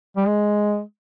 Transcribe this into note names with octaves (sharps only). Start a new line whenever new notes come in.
G3
G#3